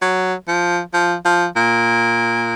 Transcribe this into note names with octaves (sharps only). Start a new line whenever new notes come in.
F#3
F3
F3
F3
A#2